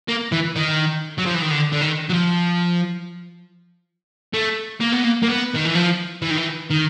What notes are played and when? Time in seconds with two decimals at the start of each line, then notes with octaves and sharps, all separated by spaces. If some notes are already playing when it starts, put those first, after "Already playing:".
0.08 A#3
0.32 E3
0.56 D#3
1.18 F#3
1.26 F3
1.34 E3
1.42 D#3
1.51 D3
1.72 D3
1.81 D#3
2.10 F#3
2.13 F3
4.34 A3
4.81 A#3
4.93 B3
5.05 A#3
5.23 A#3
5.28 B3
5.55 D#3
5.65 E3
5.75 F3
6.22 E3
6.30 D#3
6.37 E3
6.70 D#3